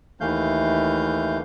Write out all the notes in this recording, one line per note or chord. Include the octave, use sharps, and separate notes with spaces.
D#2 E3 A3 F5 G6